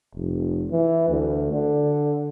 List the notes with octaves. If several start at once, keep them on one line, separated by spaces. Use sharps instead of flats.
F1
E3
D2
D3